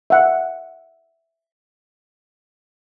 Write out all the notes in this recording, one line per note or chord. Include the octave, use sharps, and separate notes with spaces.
E5 F#5